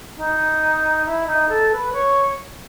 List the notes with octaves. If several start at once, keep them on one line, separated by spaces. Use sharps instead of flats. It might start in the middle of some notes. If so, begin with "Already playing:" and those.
D#4
E4
D#4
A4
B4
C#5